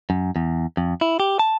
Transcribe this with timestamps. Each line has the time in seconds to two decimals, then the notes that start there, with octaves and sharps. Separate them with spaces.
0.10 F#2
0.36 E2
0.77 F2
1.01 E4
1.20 G4
1.39 A5